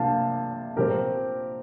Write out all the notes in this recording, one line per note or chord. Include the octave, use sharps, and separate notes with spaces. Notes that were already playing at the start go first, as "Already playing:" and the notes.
Already playing: C3 F3 A#3 D4 F5 A5
A#2 F3 C4 G4 A#4